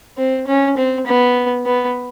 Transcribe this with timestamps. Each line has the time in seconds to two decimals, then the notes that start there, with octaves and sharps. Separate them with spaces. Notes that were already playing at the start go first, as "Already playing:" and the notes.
0.18 C4
0.47 C#4
0.77 C4
1.07 B3
1.66 B3